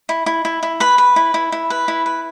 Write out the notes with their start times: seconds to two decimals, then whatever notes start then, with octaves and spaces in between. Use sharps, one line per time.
0.09 E4
0.26 E4
0.45 E4
0.63 E4
0.80 B4 B5
0.98 B4
1.16 E4
1.34 E4
1.52 E4
1.70 B4
1.88 E4
2.06 B4